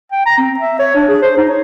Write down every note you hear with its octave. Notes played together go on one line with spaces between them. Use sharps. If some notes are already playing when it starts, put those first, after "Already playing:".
G5
A#5
C4
E5
C#5
D4
G#4
C5
D#4
C#5